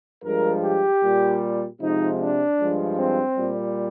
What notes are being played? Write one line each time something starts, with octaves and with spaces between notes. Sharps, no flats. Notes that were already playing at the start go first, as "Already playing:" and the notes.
G2 F3 G#3 A#4
G4
A#2 G3
C3 F3 G#3 D#4
D4
G2 F3 G#3
C4
A#2 G3